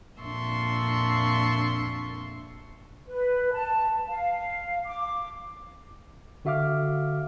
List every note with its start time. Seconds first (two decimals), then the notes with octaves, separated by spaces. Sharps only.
0.21 F2 A#2 D4 E5 C6 C#6
3.07 B4
3.53 A5
4.08 F5
4.86 D6
6.45 D3 F#4 E5 F5 D6 F6